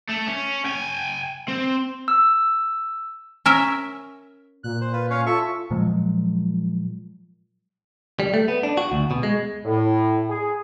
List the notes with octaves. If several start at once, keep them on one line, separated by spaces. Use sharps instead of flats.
A3
C#4
G5 G#5
C4
E6
C#4 A#4 E5
A#2 F#6
C5
F4 B4
C#4 C#5 F5
F4 A4 E5 C#6
A#2 F3 F#3 G#3
G3
A3
B3
D4
F#4
D2
B2
G#3
A2
G#4